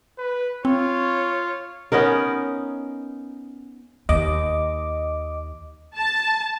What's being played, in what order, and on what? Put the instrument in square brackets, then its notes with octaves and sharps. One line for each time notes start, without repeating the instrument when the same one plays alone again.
[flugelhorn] B4
[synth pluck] C4 [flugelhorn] F4 [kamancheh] C#5
[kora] B3 C#4 D#4 A#4
[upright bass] D#2 [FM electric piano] D#5 D6
[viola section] A5